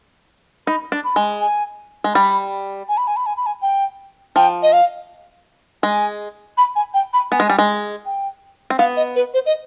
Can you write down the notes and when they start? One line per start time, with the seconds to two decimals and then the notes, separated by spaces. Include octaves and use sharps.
0.67 D#4 B5
0.92 D4
1.04 B5
1.16 G#3
1.41 G#5
2.04 G#3
2.14 G3 B5
2.89 G#5
2.97 B5
3.07 G#5
3.17 B5
3.26 G#5
3.37 B5
3.46 G#5
3.62 G5
4.36 F3 G5
4.63 D#5
4.73 F5
5.83 G#3 G#5
6.58 B5
6.76 G#5
6.94 G5
7.13 B5
7.31 B3 G#5
7.40 G#3
7.50 G3
7.59 G#3
8.06 G5
8.70 C4
8.79 B3 F5
8.97 D#5
9.16 B4
9.34 C5
9.46 D#5